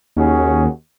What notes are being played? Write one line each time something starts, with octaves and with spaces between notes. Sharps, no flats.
D#2 C#4 F#4 G#4